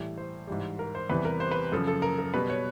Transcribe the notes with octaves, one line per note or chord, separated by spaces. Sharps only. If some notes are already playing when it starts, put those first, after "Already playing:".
Already playing: A2 E3 G3
C5
G#2 E3 G3
A#4
C5
E2 C3 E3 G3 B4
A#4
C5
B4
F#2 C#3 F3 A4
A4
A#4
A#4
B2 G3 B4
C#5